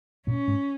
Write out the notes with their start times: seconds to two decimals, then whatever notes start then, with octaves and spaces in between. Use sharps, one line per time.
0.27 A#2 A#3 C#4
0.48 G#2 G#3